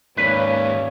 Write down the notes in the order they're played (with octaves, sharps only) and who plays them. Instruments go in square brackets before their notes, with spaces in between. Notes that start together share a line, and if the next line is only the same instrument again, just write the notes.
[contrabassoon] D#2 [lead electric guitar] G#2 D5 [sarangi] C#4 [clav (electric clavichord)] B4